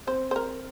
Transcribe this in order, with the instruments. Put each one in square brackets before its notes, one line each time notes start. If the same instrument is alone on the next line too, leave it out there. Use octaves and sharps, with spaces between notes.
[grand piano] C4 [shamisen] C5
[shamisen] C5
A#4